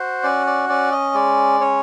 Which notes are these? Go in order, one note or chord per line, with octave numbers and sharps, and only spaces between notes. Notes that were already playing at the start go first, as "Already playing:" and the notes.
Already playing: F#4 C5
C#4 D5
D5
C#4 D5
D#5
G#3 D5
C#4 C#5